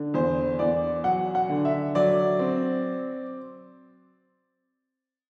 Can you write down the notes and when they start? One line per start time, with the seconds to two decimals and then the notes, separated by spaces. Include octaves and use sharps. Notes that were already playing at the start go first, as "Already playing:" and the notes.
Already playing: D3
0.14 E2 C5
0.59 E2 D5
1.04 F#3 F#5
1.35 F#5
1.49 D3
1.65 E5
1.95 F#3 D5
2.39 C4